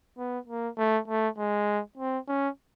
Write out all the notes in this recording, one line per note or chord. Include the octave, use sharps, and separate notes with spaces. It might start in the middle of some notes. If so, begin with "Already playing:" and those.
B3
A#3
A3
A3
G#3
C4
C#4